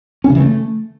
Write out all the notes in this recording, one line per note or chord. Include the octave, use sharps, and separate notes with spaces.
C#4
C#3
E3
A3